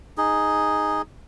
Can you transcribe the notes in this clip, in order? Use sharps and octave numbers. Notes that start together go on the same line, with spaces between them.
D#4 G#4